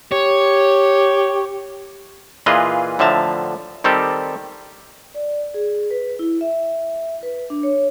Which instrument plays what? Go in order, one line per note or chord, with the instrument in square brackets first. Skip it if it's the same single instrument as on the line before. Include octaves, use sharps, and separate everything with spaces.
[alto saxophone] G4 [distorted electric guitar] C#5
[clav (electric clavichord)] A#2 E3 F4 G#4 B4 D#5
A2 D3 F3 E5 A5 A#5
D#3 G3 C4 G4 A4
[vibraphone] D5
G#4
B4
E4
E5
B4
D4
C#5